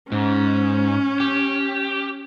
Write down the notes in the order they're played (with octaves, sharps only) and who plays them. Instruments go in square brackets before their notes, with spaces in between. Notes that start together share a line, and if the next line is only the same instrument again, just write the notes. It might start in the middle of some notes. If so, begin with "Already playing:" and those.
[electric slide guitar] G#2 [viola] C#4
[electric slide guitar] G4